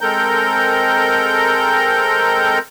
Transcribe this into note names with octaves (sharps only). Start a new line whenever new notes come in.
G#3 C4 A4 A#4 A#5 G6